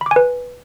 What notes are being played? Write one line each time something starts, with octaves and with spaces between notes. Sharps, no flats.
B5
D6
G#5
B4